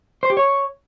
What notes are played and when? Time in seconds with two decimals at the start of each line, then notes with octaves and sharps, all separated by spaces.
0.23 C5
0.30 G4
0.37 C#5